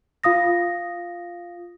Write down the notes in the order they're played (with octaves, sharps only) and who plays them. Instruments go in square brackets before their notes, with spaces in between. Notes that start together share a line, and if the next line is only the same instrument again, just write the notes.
[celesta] F4 F5 D#6 A#6